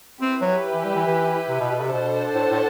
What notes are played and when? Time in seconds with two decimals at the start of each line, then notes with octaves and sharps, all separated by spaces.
0.21 C4 E4 G4 B4
0.41 F#3
0.74 E3
0.84 G3
0.96 E3
1.07 E3
1.49 C3
1.60 B2
1.71 B2
1.81 C3
1.93 B2 D4 A4 C5 F#5 A5
2.34 A2
2.50 A2